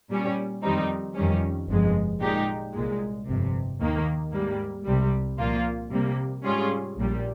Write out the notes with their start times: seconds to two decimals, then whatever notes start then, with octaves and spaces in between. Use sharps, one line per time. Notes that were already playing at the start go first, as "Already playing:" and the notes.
0.10 A#2 G3 C#4
0.63 F2 D#3 G3 C4 D#4
1.15 F2 D#3 G3 C#4
1.68 G1 F2 C3 F3 G#3
2.21 A#2 G#3 D#4 G4
2.74 C2 A#2 G#3
3.28 G1 F2 C3
3.80 D#2 D#3 A#3
4.33 G#2 G3 A#3
4.86 C2 C3 G3
5.38 C2 A#2 F3 A#3 F4
5.92 C3 G3 A#3
6.44 G#2 G3 C#4 F4 G#4
6.98 A#1 A#2 G3